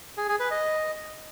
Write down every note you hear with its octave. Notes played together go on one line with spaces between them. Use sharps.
G#4
G#4
B4
D#5